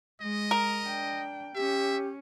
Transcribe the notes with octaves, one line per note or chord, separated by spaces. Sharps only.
G#3 D#5
A#4
D4 G5
C#4 G4 E5